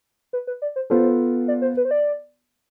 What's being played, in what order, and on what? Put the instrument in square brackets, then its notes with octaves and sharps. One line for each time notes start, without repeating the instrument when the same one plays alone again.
[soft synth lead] B4
B4
D5
C5
[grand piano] B3 F4 A4 [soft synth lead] C5
[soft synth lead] D5
C5
B4
C5
D5